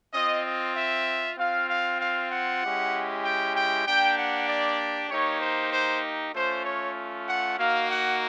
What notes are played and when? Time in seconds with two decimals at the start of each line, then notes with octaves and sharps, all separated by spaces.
0.14 C4 F4 D#5
0.46 D#5
0.76 E5
1.38 C4 F4 F5
1.69 F5
2.00 F5
2.31 F#5
2.62 G#3 C#4 E4 G4
3.24 G5
3.55 G5
3.86 A#3 D4 G4 G5
4.18 F#5
4.49 D5
5.10 A#3 D#4 G4 C#5
5.41 C5
5.72 C5
6.35 A3 C#4 F4 C5
6.65 C#5
7.27 F#5
7.58 A#3 D#4 F#4 F5
7.90 F#5